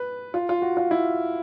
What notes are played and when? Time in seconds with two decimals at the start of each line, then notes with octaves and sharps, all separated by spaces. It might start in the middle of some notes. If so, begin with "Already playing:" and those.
Already playing: B4
0.34 F4
0.49 F4
0.62 F#4
0.77 F4
0.91 E4